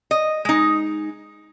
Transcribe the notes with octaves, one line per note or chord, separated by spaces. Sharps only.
D#5
G#3 D#4